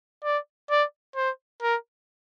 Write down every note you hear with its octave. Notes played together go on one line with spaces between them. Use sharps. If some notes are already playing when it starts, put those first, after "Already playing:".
D5
D5
C5
A#4